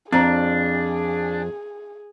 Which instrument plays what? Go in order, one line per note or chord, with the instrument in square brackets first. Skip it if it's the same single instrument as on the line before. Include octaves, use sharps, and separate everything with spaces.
[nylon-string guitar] F2 [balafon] C4 C5 A#5 [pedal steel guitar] D4 [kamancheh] G#4